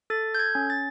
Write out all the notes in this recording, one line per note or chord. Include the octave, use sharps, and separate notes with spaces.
A4 A6
G6
G#6
C#4
A6